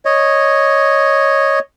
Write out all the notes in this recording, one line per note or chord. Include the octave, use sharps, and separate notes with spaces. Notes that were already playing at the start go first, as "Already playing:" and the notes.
C#5 D#5